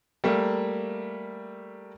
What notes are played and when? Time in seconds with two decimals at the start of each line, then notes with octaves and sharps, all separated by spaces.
0.24 G3 A3 A#3